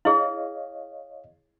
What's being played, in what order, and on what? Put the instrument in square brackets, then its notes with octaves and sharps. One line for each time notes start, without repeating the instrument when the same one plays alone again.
[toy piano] E4 G#4 [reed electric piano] C#5 D#5 F5